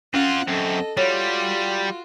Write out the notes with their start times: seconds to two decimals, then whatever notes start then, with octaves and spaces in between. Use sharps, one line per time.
0.14 C4 C#4 F4 F#5
0.48 F#2 C4 A4 D#5
0.97 G3 F4 F#4 C#5